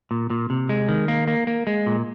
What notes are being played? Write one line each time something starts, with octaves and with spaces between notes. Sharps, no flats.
A#2
A#2
C3
G#3
D#3
A#3
A#3
A#3
G#3
A#2